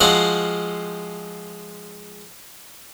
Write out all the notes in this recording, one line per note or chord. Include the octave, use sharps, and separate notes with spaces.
F3 G#3 C4 F#4 C5 F5